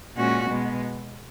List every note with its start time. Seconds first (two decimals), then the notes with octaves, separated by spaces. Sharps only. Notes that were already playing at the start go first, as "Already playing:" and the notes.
0.15 A#2 G#3 C#4 F#4
0.49 B2 G#3 B3